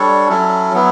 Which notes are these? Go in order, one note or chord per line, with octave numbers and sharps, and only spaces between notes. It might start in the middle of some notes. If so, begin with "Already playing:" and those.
Already playing: G3 D4 A4 C#5
F#3 C#4 E4 A4
F#3 B3 E4